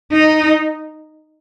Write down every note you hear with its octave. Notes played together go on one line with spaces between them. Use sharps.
D#4